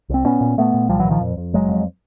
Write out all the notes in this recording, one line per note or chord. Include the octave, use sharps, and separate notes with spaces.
C2 C4
A#2 B3 C#4
A#2
A#2 A3 B3
A#2
C2 F3 G3
E3 F#3
A#2
D#3 F3
F2
F2
F#1 F#3 G#3
F2